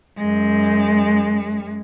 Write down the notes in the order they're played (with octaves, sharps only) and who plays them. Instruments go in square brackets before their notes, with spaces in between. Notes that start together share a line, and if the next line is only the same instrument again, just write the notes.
[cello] F#2 G#3